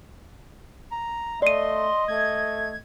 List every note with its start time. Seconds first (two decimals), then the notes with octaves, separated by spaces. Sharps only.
0.92 A#5
1.42 A3 D5 D#5 C6 D#7
2.08 A3 G#6